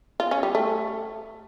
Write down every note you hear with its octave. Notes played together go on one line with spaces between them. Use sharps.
F4
C#4
G3
A3